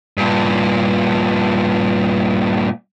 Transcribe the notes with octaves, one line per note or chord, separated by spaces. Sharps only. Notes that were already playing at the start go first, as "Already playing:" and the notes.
G2 A#2